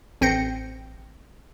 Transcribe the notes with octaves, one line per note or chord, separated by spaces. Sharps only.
A1 C4 G6 A#6 C#7